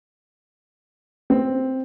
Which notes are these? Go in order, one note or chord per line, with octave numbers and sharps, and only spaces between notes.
C4